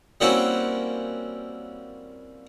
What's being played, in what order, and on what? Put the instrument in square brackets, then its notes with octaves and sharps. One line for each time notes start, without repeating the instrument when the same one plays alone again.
[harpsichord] G3 A#3 C4 C#4 E4 F#4